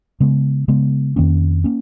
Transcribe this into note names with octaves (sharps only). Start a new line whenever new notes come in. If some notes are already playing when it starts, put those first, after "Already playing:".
C#3 G#3 B3
C#3 G#3 B3
F2 D#3 A#3 C#4
A#3 C#4